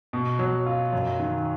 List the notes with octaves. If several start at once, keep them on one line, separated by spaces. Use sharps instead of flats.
B2
F#3
F4
F#2
D#3